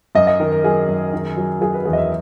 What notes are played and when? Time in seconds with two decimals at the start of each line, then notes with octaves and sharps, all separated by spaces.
0.15 F#2 D#5
0.27 D#5
0.40 D#3 A#4
0.52 A#4
0.64 F#3 G#4
0.88 F#2
1.13 D#3
1.37 F#3
1.61 F#3 G#4
1.74 B4
1.85 E2 G#4
1.93 D#5
1.97 E5